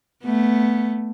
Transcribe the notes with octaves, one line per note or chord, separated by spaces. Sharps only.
A3 B3